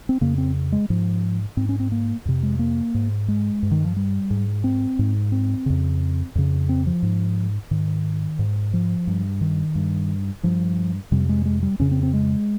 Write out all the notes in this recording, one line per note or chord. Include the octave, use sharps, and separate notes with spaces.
C4
F2 C#3 A#3
C4
G#3
G#2 F3
G#2 C4
C#4
C4
A#3
F2 C3
G#3
A#3
G#2
G#3
G2
D#3
F3
G3
G#2
C4
G#2
C4
F2 C#3
F2 C#3
C4
F3
G#2
G#2 D#3
G#2
F3
G2
D#3
G2
G2 F3
F2 C3 G3
G#3
G#3
G3
F2 C#3 C#4
C4
C4
G#3